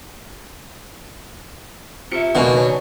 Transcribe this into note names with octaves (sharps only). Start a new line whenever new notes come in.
C3 F4 E5 C#7
C#2 B2 D#3 A#3 D4 G#5 A#5 C#6
F#3